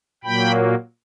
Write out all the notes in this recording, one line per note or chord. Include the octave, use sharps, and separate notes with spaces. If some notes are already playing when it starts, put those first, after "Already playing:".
A#2 F#3 A#3 G5 B5